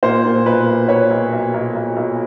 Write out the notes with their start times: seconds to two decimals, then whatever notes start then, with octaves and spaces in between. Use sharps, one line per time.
0.03 A#2 C5
0.25 A#2
0.46 B1 B4
0.67 B1
0.88 A#2 B4 C#5
1.10 B1
1.32 B1
1.54 B1
1.74 B1
1.96 B1